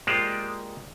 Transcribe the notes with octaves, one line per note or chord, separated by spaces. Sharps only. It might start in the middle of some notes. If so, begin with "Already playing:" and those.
G#3 A#3 F4 G4 C5 D5